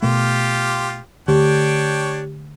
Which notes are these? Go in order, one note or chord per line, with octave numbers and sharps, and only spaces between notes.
B2 A3 F4 G4
D3 A3 D4 G4 C#5 G5